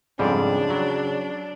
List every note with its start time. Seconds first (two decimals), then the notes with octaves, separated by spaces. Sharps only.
0.19 F2 G#2 C#3 G3 D4
0.70 F#3